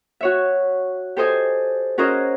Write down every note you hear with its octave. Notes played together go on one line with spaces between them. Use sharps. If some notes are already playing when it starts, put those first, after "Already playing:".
F#4 C#5 E5
G4 A4 C5 D#5 G#5
C#4 F#4 G#4 A#4 C5 D#5